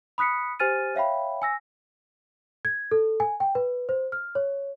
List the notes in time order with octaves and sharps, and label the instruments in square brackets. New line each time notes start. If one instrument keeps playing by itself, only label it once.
[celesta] B5 D#6 F#6 B6 C#7
G4 C5 G#5 F6 A6 D#7
C#5 E5 F5 G5 B5
G#5 E6 A#6
G#6
A4
G#5
G5
B4
C5
F6
C#5